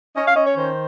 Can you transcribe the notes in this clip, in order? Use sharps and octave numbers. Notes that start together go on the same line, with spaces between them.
C#4 D#5
F5
C#4 D#5
C#5
D#3 C5